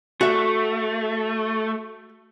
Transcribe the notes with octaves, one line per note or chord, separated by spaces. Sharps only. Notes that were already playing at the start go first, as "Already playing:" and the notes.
A3 F#4 E5